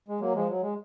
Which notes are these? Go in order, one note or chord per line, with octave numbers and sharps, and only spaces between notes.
G#3
F#3 A#3
F3 G#3
F#3
G#3